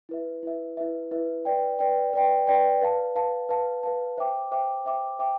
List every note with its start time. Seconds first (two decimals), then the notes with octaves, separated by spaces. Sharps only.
0.09 E4 B4 E5
0.43 E4 B4 E5
0.77 E4 B4 E5
1.11 E4 B4 E5
1.45 B4 D5 G5
1.79 B4 D5 G5
2.13 B4 D5 G5
2.47 B4 D5 G5
2.81 B4 F5 A5
3.15 B4 F5 A5
3.49 B4 F5 A5
3.83 B4 F5 A5
4.17 C5 E5 G5 D6
4.52 C5 E5 G5 D6
4.85 C5 E5 G5 D6
5.19 C5 E5 G5 D6